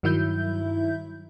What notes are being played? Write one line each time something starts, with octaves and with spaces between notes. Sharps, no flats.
G2 D#3 F#3 E4 E5 G6